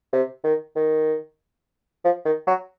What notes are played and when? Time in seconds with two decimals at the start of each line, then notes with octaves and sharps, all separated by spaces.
0.13 C3
0.44 D#3
0.76 D#3
2.04 F3
2.25 D#3
2.47 F#3